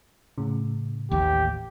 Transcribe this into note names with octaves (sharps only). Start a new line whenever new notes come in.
A2 C#3
A1 D#2 G4